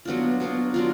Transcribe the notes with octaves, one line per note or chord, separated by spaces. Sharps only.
F#3 B3 D4 F4
F#3 B3 D4 F4
F#3 B3 D4 F4